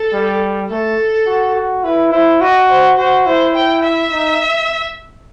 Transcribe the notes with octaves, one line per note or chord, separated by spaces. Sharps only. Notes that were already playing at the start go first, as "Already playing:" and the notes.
Already playing: A4
G3
A3 A4
F#4
F#4
E4 B4
E4 C5
F#4 D#5
C5
F#4 C5
E4 C5
G5
E5
D#4